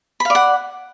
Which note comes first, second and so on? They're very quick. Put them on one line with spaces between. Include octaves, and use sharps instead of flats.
B5 F5 D5 F#5